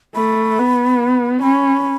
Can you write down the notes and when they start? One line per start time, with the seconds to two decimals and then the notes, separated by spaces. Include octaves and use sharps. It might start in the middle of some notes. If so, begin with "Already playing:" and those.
0.15 A3 B5
0.58 B3
1.41 C#4 B5